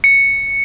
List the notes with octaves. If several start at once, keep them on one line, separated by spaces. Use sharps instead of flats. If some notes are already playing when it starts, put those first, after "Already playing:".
C#7